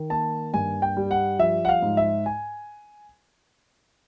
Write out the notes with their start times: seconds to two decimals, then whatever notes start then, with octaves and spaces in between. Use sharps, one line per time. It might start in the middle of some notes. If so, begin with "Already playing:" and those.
Already playing: D#3
0.10 A#3 A5
0.54 G2 G#5
0.82 G5
0.97 G3
1.11 F#5
1.39 F3 E5
1.65 F#5
1.69 F5
1.82 G#2
1.97 E5
2.26 G#5